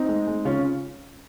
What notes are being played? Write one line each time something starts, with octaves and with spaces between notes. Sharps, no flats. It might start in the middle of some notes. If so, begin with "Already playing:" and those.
Already playing: C4 D#4
G#3
G#3
C#3 C#4 F4